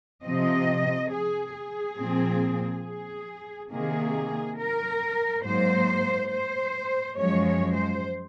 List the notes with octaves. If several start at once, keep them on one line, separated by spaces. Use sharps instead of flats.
C3 F3 C4 D#5
G#4
G#4
A#2 F3 C4
G#4
C3 D#3 A#3 G#4
A#4
G#2 F#3 A#3 C5
C5
F#2 F3 G#3 C#5
C#5
C5